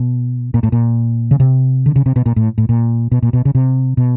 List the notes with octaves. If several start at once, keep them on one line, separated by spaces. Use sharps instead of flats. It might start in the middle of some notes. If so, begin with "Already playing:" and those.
Already playing: B2
A#2
A2
A#2
C#3
C3
D3
C#3
C3
B2
A#2
A2
A2
A#2
B2
A#2
B2
C#3
C3
B2